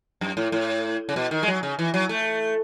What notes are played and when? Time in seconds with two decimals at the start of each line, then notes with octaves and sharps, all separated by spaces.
0.21 F#2
0.37 A2
0.52 A2
1.09 C#3
1.16 B2
1.31 D#3
1.43 G#3
1.47 F#3
1.63 C#3
1.79 E3
1.94 F#3
2.09 A3